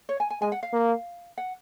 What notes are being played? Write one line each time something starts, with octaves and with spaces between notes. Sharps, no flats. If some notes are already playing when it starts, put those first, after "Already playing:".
C#5
G#5
G#5
G#3 G#5
F#5
F5
A#3
F#5